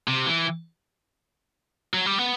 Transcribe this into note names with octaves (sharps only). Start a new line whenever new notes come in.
C3
E3
F#3
G3
B3